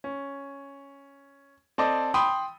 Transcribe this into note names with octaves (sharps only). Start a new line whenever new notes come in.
C#4
C4 A4 D5 D#5
G5 B5 C6 D#6